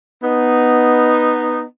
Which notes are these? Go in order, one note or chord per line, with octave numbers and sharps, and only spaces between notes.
B3 D#4